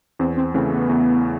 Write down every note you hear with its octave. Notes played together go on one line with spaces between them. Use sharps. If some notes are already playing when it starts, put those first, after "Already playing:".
E2 C4
C4
C#3 E3 A3 C4
B3
E2